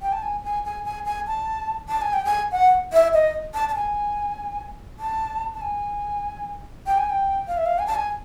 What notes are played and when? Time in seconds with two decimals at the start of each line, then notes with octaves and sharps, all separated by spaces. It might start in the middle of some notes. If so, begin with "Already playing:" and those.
0.02 G5
0.13 A5
0.23 G#5
0.44 G#5
0.65 G#5
0.85 G#5
1.05 G#5
1.27 A5
1.88 A5
2.02 G#5
2.13 G5
2.25 G#5
2.52 F#5
2.93 E5
3.14 D#5
3.54 A5
3.69 A5
3.75 G#5
4.99 A5
5.54 A5
5.62 G#5
6.87 G5
6.98 G#5
7.09 G5
7.48 F5
7.57 E5
7.66 F5
7.79 G#5
7.87 A5
7.95 G#5